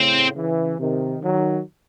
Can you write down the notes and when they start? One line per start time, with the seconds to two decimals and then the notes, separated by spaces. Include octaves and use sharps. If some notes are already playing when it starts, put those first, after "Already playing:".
Already playing: A2 C#3 C4
0.35 C#3 E3
0.78 C3 D#3
1.22 D#3 F#3